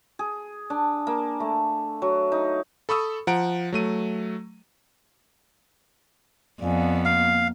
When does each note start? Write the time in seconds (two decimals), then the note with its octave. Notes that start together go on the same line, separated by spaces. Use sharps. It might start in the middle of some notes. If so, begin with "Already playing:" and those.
0.19 G#4
0.70 D4
1.07 A#3
1.40 A3
2.02 F#3
2.32 D#4
2.89 A4 B5 C#6 D#6 E6
3.27 F3 F#5 A#5 D7
3.72 F#3 A3 D#7
6.60 F2 B3 D5 F5 G#5
7.05 A#3 F5